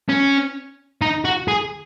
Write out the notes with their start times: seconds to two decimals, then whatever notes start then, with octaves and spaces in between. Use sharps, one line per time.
0.09 C#4
1.02 D#4
1.25 F#4
1.48 G#4